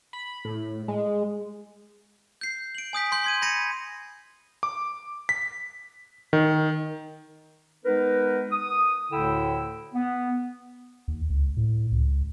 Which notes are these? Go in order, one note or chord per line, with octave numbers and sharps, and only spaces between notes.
B5
A2
G#3
G6 C7
D7 F#7
G#5 D#6 G6 B6
C6 G6
C6 G#6 D#7
B5 G#6 A#6 C#7 D#7
D6
B6
D#3
G#3 B3 D#4 A#4 B4
D#6
D2 A2 D3 E4 G5 E6
B3
D#2
C#2
A2
C#2